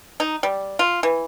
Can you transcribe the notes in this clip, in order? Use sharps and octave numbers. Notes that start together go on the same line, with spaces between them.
D#4
G3
F4
E3